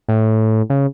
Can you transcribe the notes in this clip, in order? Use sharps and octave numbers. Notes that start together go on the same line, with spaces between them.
A2
C#3